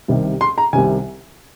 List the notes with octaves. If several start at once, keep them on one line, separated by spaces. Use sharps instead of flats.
C2 C3 D#3
C6
A#5
C2 C3 D#3 G#5